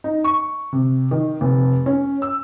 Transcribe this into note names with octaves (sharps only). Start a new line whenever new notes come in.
D#4
C#6
C3
D#3
F1
C#4
E6